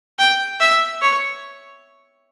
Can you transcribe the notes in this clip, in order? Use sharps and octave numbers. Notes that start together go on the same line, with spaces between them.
G5
E5
C#5